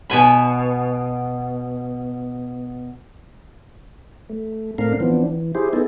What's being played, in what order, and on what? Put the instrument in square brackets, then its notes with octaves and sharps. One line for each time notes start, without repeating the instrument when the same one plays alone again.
[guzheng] B2 G#5 B5
[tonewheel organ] A3
A2 A3 C4 D4 A#4 F5
E3 F3 B3 C4 D4
E3
E4 G4 G#4 C5
B3 D#4 E4 G#4 A4